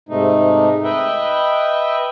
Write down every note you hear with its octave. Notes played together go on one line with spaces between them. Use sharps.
G#2 C3 A3 D#4
B4 D#5 E5 G5